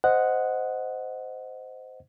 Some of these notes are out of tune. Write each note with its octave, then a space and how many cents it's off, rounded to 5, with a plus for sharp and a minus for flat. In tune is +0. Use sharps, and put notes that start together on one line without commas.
C5 -15 D#5 +0 F#5 +0